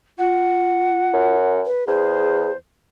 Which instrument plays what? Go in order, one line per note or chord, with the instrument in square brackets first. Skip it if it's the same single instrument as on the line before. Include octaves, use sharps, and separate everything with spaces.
[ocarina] F4 [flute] F#5
[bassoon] F#2
[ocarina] B4
[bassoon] E2 [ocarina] G#4 [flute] C5